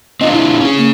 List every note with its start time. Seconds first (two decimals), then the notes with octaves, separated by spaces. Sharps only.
0.21 C4 D4 F4 D#5
0.33 E4
0.61 C#4 G#4
0.78 A#3